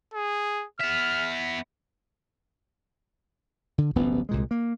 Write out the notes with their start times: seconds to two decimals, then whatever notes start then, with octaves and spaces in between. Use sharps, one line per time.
0.14 G#4
0.80 B3 E5 F6
3.78 D3
3.96 D1 A1 G2 B3
4.29 C2 A#2 G#3
4.51 A#3